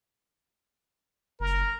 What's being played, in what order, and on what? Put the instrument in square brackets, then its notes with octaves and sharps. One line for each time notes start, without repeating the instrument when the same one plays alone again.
[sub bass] F#1 [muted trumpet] A#4